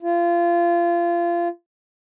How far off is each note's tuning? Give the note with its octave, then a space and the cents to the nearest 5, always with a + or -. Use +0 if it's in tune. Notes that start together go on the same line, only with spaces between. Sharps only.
F4 -25